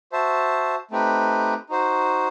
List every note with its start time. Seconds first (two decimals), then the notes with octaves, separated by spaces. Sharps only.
0.12 F#4 C5 E5 A5
0.91 A3 C4 D#4 G4 B4
1.70 D#4 F#4 C5